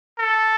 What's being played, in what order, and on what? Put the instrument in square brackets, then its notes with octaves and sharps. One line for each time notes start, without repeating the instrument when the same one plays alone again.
[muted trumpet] A4